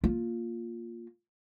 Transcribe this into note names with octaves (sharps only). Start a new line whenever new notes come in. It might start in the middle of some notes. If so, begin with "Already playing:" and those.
A#3 F4